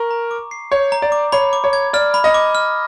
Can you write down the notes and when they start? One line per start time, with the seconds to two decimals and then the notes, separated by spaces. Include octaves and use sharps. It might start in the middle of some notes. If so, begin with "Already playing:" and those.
Already playing: A#4 C#6
0.11 A#5
0.31 D6
0.51 C7
0.72 C#5 G6
0.92 A#5
1.02 D5
1.12 D6
1.32 C#5 B5
1.53 D6
1.64 C#5
1.73 G#6
1.93 D5 F6
2.14 B5
2.24 D#5
2.34 D6
2.55 F6